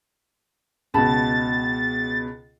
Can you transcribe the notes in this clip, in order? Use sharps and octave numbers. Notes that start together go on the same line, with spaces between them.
C#2 B2 E4 A5 B5 A6